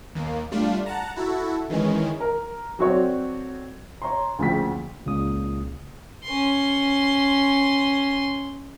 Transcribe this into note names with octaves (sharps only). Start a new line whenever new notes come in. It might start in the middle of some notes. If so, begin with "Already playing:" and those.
D#2 A#3
G3 A3 D4 F4
F#5 A5 A#5
E4 F#4 A4
D#3 E3 G#3 C#4
A#4
F#3 C4 F#4 A4 C#5 D5
C#5 A#5 C6
D2 A#2 C#3 F3 G5 B6
C#2 A#2 C#3 D#6
C#4 C6